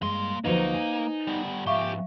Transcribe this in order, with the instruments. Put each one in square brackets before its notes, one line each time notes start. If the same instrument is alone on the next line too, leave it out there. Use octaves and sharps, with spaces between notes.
[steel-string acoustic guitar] G2 G#3 [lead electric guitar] A#3 C6
[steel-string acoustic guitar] D2 F3 F#3 [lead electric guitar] A#3 [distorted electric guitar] D#4 [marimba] B4 C5
[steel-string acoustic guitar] G#5
[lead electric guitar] G3 B3
[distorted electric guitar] G#2 F3 [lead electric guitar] G4 [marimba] E5 F5 C#6